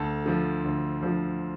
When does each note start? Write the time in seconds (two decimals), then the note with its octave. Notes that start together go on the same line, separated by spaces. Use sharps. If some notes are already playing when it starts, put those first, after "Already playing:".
Already playing: D2 A4
0.26 D3 F3
0.64 D2
1.03 D3 F3